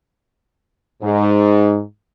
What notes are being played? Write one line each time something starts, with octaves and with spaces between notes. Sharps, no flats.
G#2